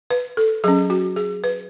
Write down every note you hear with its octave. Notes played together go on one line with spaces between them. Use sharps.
B4
A4
F#3 C#4 G#4
F#4
G#4
B4